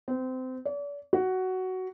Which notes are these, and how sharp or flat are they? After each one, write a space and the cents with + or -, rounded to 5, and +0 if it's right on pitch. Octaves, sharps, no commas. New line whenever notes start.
C4 -25
D5 -40
F#4 +10